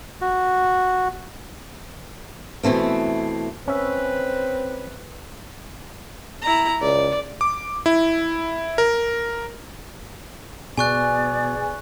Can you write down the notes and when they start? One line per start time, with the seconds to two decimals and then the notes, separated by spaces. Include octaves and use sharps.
0.21 F#4
2.63 B2 E3 A3 C4
3.68 C4 C#4 B4 E5
6.42 E4 A#5
6.81 C#2 D5
7.41 D6
7.86 E4
8.78 A#4
10.77 B2 B3 G#4 D5 G#5 C#6 F#6